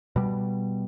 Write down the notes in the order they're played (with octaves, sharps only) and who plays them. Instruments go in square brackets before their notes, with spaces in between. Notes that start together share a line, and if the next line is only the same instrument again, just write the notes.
[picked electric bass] B2 G3